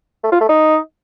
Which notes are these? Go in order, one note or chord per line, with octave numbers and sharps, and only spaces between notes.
A3
F4
A3
D#4